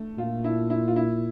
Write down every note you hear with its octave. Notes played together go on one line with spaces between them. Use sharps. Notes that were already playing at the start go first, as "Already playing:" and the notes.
Already playing: A3
A#2 F4
E4
E4
F4
E4